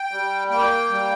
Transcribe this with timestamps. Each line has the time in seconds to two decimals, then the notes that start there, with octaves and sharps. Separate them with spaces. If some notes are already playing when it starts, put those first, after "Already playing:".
Already playing: G5
0.12 G3
0.50 A#3 G5
0.90 G3